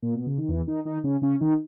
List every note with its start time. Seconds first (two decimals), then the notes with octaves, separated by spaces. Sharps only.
0.02 A#2
0.14 B2
0.26 C#3
0.38 D#3
0.49 E2 E3
0.67 D#3 D#4
0.85 D#3 D#4
1.04 C#3 C#4
1.22 C#3 C#4
1.40 D#3 D#4